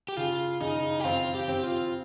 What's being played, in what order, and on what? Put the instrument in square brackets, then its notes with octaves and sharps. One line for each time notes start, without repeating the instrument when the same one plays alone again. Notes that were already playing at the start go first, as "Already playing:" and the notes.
[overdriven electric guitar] G4
[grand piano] C#3 [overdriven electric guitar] F4
[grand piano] C#3 [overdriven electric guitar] D#4
[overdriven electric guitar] G4
[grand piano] C4 [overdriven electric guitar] F4
[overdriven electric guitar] G4
[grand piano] C4
[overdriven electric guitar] F4